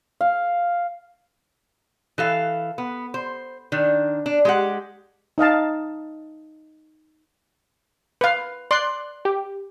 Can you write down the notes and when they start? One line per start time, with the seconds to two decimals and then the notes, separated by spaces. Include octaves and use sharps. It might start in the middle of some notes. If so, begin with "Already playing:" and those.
0.21 F5
2.18 E3 A4 F5
2.78 B3
3.14 C5
3.72 D#3 D4
4.26 D4
4.45 G#3 G4 F#5
5.38 D#4 D#5 F5 A5
8.21 B4 F5
8.71 D5 C6 F#6
9.25 G4